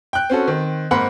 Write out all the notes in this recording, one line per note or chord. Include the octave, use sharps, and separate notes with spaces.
G5 F#6
C4 C#4 F#4 A4
D#3 C4
G#2 A#3 C4 F#5 B5